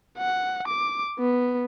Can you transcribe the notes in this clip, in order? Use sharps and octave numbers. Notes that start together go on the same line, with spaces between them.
F#5
D6
B3